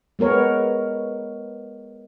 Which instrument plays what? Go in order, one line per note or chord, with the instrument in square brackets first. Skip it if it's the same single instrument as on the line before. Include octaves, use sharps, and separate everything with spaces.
[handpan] G#3 B3 A#4 C#5